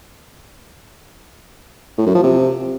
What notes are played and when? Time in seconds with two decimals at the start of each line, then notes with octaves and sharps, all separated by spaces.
1.98 A2
2.06 F#2
2.15 F3
2.23 C3